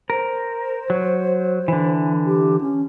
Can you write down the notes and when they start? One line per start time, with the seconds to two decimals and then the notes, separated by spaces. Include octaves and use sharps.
0.10 A#4 C5
0.90 F#3
1.68 D3 E3
2.26 G4
2.61 C#4